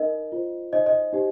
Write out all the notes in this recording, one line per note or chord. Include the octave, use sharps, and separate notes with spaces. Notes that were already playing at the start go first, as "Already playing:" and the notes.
Already playing: D#4 A#4 D#5
F4 C5
D#4 C5 D#5
D#5
D#4 G4 C5